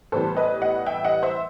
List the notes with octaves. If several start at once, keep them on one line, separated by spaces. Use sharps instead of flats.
A2 E3 G3 B3 A4 C5
B4 D#5
D#5 F#5
E5 G5
D#5 F#5
C5 E5